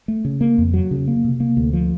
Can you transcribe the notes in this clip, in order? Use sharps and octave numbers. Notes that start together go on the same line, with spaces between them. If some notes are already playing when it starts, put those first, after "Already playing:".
A3
C#3
A#3
F2
F#3
C#3
A#3
C3
A#3
D2
F3